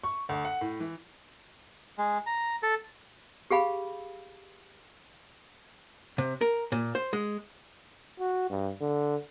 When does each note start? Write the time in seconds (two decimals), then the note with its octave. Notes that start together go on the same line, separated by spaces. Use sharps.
0.04 C#6
0.29 D2
0.45 F#5
0.61 A2
0.80 E3
1.98 G#3
2.26 A#5
2.63 A4
3.51 G4 G#4 F5 B5
6.18 C3
6.41 A#4
6.72 A#2
6.95 C5
7.13 G#3
8.20 F#4
8.49 G2
8.81 D3